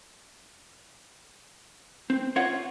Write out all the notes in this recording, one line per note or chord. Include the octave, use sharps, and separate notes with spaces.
C4
C#4 F4 C#5 F#5